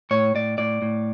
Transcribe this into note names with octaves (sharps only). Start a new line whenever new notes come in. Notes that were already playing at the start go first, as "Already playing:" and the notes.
A2 C#5
A2 D5
A2 D5
A2